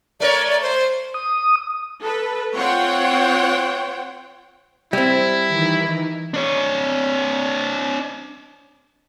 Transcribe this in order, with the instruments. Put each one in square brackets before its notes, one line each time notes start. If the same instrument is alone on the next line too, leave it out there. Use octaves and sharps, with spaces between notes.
[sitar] A3 A#4 C#5 [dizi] D5
[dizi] D5
C5
[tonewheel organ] D#6
[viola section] A4 B4
C4 F4 C5 C#5 F#5 G5
[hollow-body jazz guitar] G3 C4 [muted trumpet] E4
[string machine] D#3 E3 D#4
[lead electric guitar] D4 C#5